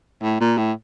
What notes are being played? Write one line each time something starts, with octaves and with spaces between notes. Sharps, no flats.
A2
A#2
A2